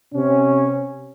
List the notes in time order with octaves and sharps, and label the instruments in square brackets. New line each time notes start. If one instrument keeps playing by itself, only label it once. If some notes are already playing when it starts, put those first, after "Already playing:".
[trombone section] C3 C#4